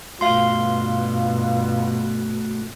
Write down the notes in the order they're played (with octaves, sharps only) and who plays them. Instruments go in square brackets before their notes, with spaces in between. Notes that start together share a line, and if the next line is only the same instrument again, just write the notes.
[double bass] G2 B2 [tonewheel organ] A3 F#4 [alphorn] F4 [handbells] F5 C6